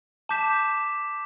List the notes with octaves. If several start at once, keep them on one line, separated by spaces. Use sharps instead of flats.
A5 D6 G6 B6 E7